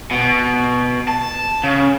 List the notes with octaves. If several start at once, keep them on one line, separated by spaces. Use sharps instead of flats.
B2
A5
C#3